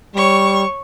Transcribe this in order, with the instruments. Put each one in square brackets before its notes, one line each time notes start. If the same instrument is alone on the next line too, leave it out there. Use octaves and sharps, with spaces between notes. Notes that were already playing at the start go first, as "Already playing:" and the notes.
[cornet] G3 [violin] C#5 C#6